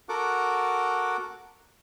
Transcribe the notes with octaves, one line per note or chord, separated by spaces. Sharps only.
F#4 A4 A#4 F#5 D6